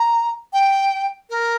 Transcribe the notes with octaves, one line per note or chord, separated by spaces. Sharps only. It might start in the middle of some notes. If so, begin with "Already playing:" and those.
Already playing: A#5
G5
A#4